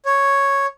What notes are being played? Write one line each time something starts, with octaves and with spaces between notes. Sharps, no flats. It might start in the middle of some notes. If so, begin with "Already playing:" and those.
C#5